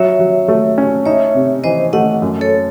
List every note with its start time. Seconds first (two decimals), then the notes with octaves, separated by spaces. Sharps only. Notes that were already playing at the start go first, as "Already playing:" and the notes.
Already playing: F#3 C#5 E5
0.19 F#3
0.48 A3
0.78 C#4
1.06 D#4 C#5 E5
1.35 C3
1.64 E3 C5 D#5
1.93 A3 D#5 F#5
2.22 F#2
2.41 A4 C#5